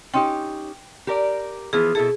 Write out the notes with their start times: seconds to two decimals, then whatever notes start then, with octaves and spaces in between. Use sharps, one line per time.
0.14 C#4 D#4 G4 G5 C6
1.07 G4 A#4 D5
1.73 E3 F3 B3 G#4
1.95 B2 E4 G#4 A4